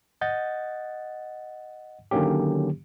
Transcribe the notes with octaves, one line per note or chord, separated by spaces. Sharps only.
D#5 F#5 G6 A6
D3 D#3 F#3 A#3 C#4 G4